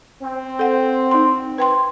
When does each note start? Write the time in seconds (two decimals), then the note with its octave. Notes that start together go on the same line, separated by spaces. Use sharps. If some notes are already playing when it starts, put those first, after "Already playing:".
0.23 C4
0.59 A4 F#5
1.11 D#4 C6
1.58 B4 G5 C6